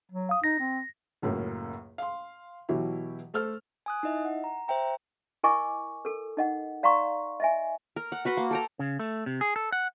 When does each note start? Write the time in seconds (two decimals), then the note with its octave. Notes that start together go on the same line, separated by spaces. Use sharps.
0.12 F#3
0.29 F5 D#6
0.44 D#4 A#6
0.59 C4
1.22 C#2 F#2 A2 A#3
1.98 F5 C6
2.69 B2 E3 F#3 E4 G4
3.34 A3 A4 C5 F6
3.86 G#5 D#6 F#6
4.03 D#4 E4 D#5 E5
4.25 F#5
4.44 A#5
4.68 C5 E5 G5 A#5
5.43 E4 A#4 D#5 G#5 C#6 D6
6.05 A4 A#4
6.37 D#4 D#5 F#5
6.83 D5 F5 A#5 C6 C#6
7.40 D#5 E5 G#5
7.96 A#4
8.12 F#5
8.25 F#4 B4 F#5 C6
8.37 A#3
8.51 A4 G5 A#5
8.79 C#3
9.00 A3
9.26 C3
9.41 G#4
9.56 A4
9.72 F#5